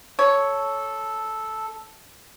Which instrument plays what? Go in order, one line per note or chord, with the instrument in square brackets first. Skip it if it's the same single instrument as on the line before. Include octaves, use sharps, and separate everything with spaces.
[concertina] A4 [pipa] C#5